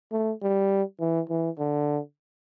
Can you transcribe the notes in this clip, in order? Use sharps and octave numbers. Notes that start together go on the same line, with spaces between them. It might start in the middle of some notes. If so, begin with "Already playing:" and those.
A3
G3
E3
E3
D3